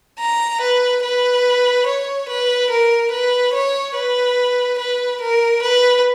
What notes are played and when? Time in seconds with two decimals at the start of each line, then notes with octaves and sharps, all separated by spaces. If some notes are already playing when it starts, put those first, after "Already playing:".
0.19 A#5
0.61 B4
1.03 B4
1.87 C#5
2.29 B4
2.70 A#4
3.12 B4
3.54 C#5
3.95 B4
4.79 B4
5.21 A#4
5.62 B4